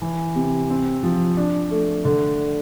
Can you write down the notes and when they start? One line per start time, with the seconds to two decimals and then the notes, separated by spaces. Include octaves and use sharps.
0.02 E3
0.35 C3
0.70 C4
1.03 F3
1.37 D4
1.71 A3
2.05 D3